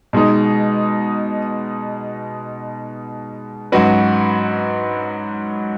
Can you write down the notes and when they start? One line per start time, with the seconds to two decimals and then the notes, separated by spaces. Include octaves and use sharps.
0.13 B2 G#3 D#4
3.72 G#2 F#3 C#4 F#4 B4